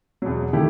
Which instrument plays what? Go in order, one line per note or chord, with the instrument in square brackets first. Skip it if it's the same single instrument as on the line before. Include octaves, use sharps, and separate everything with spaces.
[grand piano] E2 B2 F#3
D#3 A3 E4 G4